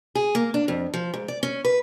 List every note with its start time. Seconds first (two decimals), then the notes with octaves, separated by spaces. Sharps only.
0.15 G#4
0.35 A#3
0.54 D4
0.68 F2
0.94 F3
1.14 G#2
1.28 D5
1.43 C#4
1.65 B4